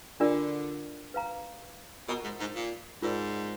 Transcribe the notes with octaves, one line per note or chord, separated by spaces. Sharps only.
D3 D4 F4 A#4 D5
B4 F5 A#5
B2 F4 A#4 D#5 F#5 A#5
G#2
G#2
A#2
G#2 F4 A#4 D5